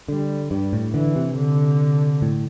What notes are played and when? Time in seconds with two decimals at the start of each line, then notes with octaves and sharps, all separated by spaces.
0.08 D3 G3
0.51 G2 G3
0.73 A2
0.94 D3 E3
1.16 C3
1.36 D3
2.22 A2